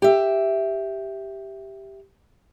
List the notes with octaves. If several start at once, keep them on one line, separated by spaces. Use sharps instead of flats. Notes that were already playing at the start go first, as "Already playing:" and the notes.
G4 E5